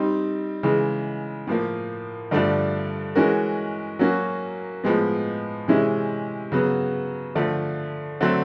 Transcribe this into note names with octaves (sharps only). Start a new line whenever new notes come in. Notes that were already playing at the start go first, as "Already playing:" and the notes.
Already playing: G3 C4 D#4
C#3 E3 G#3
A2 F3 A#3
G2 D3 F3 A3 D4
E3 G#3 C#4 F#4 A#4
F#3 A#3 C#4 F#4
A2 F3 G#3 B3
C3 E3 G#3 C#4 E4
C#3 F#3 B3
D3 F3 A3
D3 F#3 A3 C4